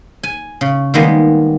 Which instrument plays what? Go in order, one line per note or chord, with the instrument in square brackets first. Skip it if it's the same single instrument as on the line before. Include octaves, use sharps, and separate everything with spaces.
[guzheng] G#5
C#3
D#3 G3 G#3 A#3 B3